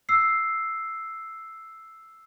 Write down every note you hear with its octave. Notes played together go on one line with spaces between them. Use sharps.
E6 C7